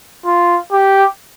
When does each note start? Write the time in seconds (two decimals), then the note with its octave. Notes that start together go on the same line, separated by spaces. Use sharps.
0.26 F4
0.72 G4